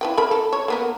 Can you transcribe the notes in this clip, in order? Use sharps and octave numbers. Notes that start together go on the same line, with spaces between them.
E4 B4 G5
A#4 B5
A4
C#5
A#3 B3 A#4